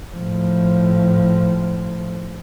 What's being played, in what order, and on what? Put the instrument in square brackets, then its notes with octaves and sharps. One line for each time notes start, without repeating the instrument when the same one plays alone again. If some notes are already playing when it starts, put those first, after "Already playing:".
[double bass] A2 F3